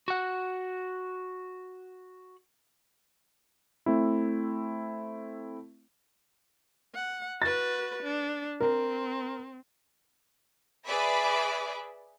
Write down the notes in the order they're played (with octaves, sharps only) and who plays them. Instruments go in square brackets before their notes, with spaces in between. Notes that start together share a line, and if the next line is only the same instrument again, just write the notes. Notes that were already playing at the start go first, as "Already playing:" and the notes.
[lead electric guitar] F#4 F#5
[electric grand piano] A3 C4 E4
[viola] F#5
[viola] F#4 B4 [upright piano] A6
[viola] D4
[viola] C4 [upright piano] A#4
[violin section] G#4 B4 D5 E5 B5 D6